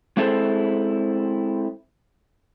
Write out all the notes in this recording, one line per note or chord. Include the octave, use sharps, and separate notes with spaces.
G#3 C4 E4 G#4 A4 C5